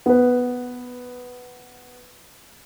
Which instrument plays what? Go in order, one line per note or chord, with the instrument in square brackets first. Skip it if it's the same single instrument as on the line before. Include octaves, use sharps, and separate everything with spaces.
[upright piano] B3 B4